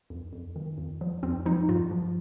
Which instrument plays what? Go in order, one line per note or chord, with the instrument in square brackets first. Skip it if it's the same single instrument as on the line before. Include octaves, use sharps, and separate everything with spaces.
[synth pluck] F2
F2
D#3
F2
F3
F2 C4
F3 D#4
G2 F4
F3